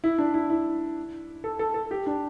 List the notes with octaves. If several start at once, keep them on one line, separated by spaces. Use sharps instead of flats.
E4
D4
E4
E4
A4
A4
A4
G4
D4